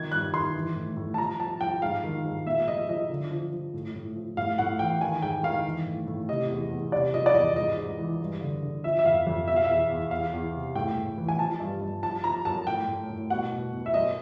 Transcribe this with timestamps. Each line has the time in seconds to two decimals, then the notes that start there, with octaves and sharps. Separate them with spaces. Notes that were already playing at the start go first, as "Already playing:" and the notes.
Already playing: D#3 F3 G#6
0.12 G2 F#6
0.33 D#3 C6
0.54 E3
0.76 A2
0.97 A2
1.14 A5
1.18 F3 A#5
1.39 F3 A5
1.61 F3 G5
1.82 G#2 F5
2.04 D#3
2.24 G#2
2.47 A#2 E5
2.67 F3 D#5
2.89 F3 D#5
3.09 D3
3.31 F3
3.52 F3
3.74 A2
3.95 A2
4.16 F3
4.37 A2 F5
4.58 A2 F#5
4.79 E3 G5
5.01 D#3 G#5
5.22 G#2 G5
5.43 D#3 F5
5.65 E3
5.86 A2
6.07 A2
6.29 C3 D#5
6.50 E2
6.71 E2
6.92 C3 D5
7.13 F3 D#5
7.26 D5
7.34 E2 D#5
7.56 G#2 D#5
7.78 G#2
7.99 E3
8.20 G2
8.41 D3
8.62 D3
8.84 F3 E5
8.99 E5
9.05 F2 F5
9.27 F2
9.48 B2 E5
9.56 F5
9.64 E2 E5
9.90 E2
10.11 E2 F5
10.33 E2
10.54 C3
10.75 A2 G5
10.97 A2
11.18 E3
11.28 G#5
11.39 F3 A5
11.60 G2
11.81 G2
12.03 F3 A5
12.24 F3 A#5
12.45 F#2 A5
12.67 A2 G5
12.88 A2
13.09 A2
13.30 B2 F#5
13.52 B2
13.73 B2
13.86 E5
13.94 F#2 D#5